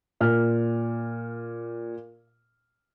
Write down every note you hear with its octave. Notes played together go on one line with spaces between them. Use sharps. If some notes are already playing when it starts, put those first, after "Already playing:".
A#2 F6